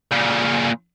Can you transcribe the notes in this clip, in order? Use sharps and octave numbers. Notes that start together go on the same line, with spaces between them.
A#2 C#3